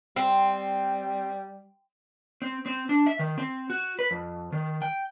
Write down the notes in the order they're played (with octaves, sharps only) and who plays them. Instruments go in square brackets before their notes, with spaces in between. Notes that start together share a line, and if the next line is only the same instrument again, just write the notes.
[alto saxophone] G3 [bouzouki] C4
[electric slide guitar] C4
C4
D4
E5
D#3
C4
F#4
B4
F2
D#3
G5